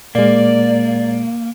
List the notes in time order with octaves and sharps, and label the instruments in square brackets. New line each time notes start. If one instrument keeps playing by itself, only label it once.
[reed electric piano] A#2 G#3 [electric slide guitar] A#3 [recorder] D5